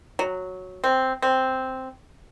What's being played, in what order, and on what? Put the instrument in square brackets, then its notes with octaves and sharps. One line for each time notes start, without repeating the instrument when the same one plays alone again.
[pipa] F#3
C4
C4